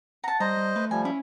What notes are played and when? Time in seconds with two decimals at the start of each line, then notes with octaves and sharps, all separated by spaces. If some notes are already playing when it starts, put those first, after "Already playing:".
0.24 F#5 A5 A#5
0.40 G3 C5 D#5 A#5
0.57 G3
0.76 A3 B4
0.91 F3 G3 G#5
1.05 C#4 E4